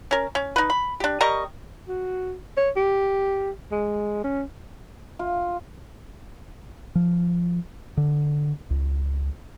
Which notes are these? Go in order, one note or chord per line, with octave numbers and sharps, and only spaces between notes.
C#4 A#4
C#4
D#4 B4
B5
D4 G4
G3 A#4 D#5 C#6
F#4
C#5
G4
G#3
C#4
F4
F3
D3
C#2